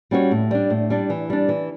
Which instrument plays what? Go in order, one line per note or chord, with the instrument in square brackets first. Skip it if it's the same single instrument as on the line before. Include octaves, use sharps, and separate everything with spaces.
[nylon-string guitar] G3 C#4 F#4 C#5
A2
G3 D4
A2
G3 D4
E3
G3 D4
E3